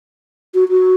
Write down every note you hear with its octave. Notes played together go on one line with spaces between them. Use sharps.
F#4
F#4